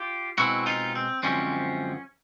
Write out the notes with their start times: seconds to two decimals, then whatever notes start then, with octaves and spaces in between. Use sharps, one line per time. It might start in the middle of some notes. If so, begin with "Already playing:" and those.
Already playing: F4 G4
0.38 B2 G#3 C4 E4 F#4
0.66 D#4 F4
0.95 C4
1.23 F#2 D3 F3 G#3 C4 C#4